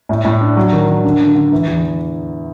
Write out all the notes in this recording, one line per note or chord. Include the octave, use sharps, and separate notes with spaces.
A2
A2
D4
F#3
D#3
D#3
D3
D3
D3
E3
E2